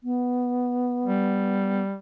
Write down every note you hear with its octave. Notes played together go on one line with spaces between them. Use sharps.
B3
G3